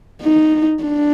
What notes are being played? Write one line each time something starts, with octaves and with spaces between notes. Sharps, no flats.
D#4
D4